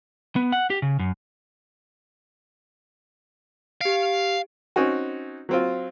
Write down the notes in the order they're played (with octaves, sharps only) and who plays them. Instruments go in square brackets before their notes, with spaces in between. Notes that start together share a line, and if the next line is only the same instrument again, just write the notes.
[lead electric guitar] B3
F#5
G4
C#3
F#2
[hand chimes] G4 D7 [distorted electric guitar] F5
[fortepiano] C4 C#4 D#4 F#4
F#3 C4 F4